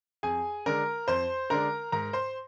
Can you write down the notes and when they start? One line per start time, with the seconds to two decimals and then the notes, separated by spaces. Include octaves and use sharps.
0.23 F2 G#4 G#5
0.66 D3 G#3 D4 A#4 A#5
1.08 F2 C5 C6
1.50 D3 G#3 D4 A#4 A#5
1.92 G#2 A#4 A#5
2.13 C5 C6